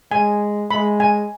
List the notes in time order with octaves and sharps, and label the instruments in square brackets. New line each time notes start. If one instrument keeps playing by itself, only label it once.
[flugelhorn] G#3 [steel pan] G#5
[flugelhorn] G#3 [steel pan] B5
[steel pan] G#5